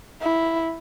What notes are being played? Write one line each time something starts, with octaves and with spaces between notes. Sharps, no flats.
E4